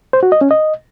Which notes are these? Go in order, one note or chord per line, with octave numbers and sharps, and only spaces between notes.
C5
F#4
D#5
C#4
D#5